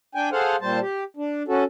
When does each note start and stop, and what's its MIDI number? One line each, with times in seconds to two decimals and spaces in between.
0.15 0.29 62
0.15 0.29 79
0.15 0.29 80
0.32 0.56 68
0.32 0.56 69
0.32 0.56 72
0.32 0.56 77
0.32 0.56 78
0.61 0.80 46
0.61 0.80 55
0.61 0.80 72
0.61 0.80 81
0.81 1.04 67
1.17 1.43 62
1.48 1.64 61
1.48 1.64 66
1.48 1.64 69